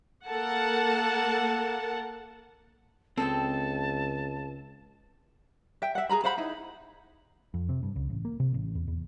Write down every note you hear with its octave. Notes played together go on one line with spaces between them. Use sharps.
A#3 A4 A#4 F#5 A5
C#2 C4 A4 D#5 G5 A5
E5 G5
E5 F#5
G#4 A4 A#5 B5
C5 F5 F#5 B5
D#4 E4
F2
C3
G2
C#2
A1
A#3
C3
A1
E2
E2